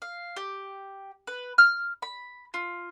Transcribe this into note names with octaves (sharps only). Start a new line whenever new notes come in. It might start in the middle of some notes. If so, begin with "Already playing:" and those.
F5
G4
B4
F6
B5
F4